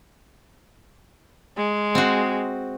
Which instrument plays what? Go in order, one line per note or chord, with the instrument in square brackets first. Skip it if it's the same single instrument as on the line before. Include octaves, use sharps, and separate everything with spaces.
[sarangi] G#3
[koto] C4 F#4